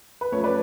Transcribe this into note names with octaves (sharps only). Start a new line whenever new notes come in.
B4
F#2 F3 A3 C#5
B4 D5